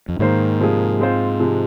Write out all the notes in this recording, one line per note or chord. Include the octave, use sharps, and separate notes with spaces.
F2
G#2 D#3 A#3 G#4 C5
C3 F3 A#3 G#4
G#3 C4 F4 C5
C3 F3 G#3